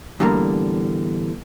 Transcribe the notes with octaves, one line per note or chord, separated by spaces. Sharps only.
E2 A2 D3 G3 A#3 A#5